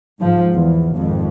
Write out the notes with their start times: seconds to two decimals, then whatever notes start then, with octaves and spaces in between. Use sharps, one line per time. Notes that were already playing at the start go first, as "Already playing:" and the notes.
0.20 G#2 F3
0.54 E2
0.94 G#1 F2